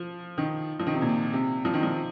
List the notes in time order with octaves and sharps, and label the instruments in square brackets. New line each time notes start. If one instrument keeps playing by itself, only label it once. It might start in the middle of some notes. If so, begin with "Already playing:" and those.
Already playing: [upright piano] F3
D#3
F3
D#3
C3
A#2
C3
F3
D#3
F3